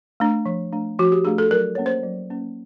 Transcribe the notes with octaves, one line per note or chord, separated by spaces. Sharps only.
A3 D4
F3
A3 D4
F3 F#4
G4
A3 D4 G#4
A4
F#3 A#4
A#3 C#4 C#5
C5
F#3
A#3 C#4